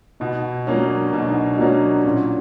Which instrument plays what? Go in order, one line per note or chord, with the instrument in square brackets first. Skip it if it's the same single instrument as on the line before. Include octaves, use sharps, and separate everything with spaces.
[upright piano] B2 [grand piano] D#4
[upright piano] F#3 A#3 C#4 [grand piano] D4
[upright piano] B2 [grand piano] D#4
[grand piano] D4
D#4
D#4
[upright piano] F#3 A#3 C#4 [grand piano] D4
[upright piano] A#2 [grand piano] C#4